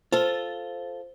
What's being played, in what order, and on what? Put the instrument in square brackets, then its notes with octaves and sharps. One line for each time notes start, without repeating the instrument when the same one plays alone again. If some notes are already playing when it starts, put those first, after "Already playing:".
[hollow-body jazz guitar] F4 A4 [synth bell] C5 G7